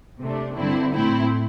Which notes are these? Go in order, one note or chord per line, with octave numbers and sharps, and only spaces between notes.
C3 A3 D4
G2 D3 C4 E4
A2 A3 C4 E4